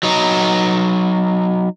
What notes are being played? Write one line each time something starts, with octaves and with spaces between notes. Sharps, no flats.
F#3 D#4